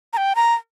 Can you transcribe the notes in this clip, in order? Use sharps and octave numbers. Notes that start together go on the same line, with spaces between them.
A#5
G5
A#5